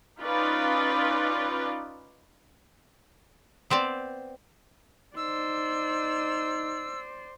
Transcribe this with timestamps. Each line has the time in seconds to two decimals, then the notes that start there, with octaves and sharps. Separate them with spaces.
0.20 C#4 D#4 F4 B4 D5
3.70 B3 C4 C5 D5
5.16 D#4 C5 D5 E6